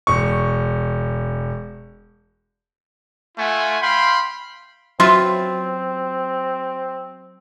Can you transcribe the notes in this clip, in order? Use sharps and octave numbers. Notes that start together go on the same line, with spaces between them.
E1 C#6
A3 F4 F#5 G#5
F5 G5 B5 C6
F#3 C4 F4 B4 E5 C6